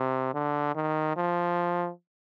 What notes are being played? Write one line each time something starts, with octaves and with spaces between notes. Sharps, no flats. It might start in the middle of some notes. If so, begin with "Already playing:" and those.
Already playing: C3
D3
D#3
F3